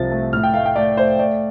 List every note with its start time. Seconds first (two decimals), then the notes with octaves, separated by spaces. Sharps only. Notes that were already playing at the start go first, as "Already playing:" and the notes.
Already playing: C2 C3 F3 A6
0.11 A3
0.33 A2 F6
0.43 G5
0.54 A3 F5
0.65 G5
0.76 A3 D5
0.97 A3 C5
1.19 A3 D5